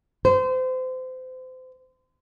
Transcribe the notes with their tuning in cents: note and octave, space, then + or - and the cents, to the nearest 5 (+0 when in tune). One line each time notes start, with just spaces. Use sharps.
C5 -30